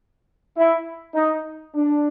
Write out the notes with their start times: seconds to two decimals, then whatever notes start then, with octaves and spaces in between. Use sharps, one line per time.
0.56 E4
1.15 D#4
1.75 D4